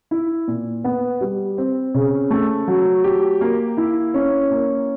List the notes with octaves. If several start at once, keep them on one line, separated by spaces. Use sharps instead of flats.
E4
A#2
B3
G3
C4
C#3
A3
F#3
G4
A#3
E4
C#4
A#3